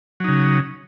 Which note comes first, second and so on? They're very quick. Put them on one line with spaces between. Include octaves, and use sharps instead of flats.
F#3 D#4 C#3